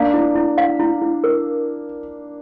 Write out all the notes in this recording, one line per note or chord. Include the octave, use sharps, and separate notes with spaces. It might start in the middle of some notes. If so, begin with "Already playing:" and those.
Already playing: A#3 D4 F5
E4
E4
F5
E4
E4
A#4